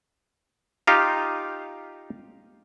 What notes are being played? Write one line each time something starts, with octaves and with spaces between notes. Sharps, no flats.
D#4 F4 G4 F5